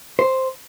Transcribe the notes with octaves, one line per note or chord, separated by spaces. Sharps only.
C5